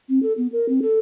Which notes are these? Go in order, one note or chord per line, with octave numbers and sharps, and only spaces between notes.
C4
A4
B3
A#4
C4
A4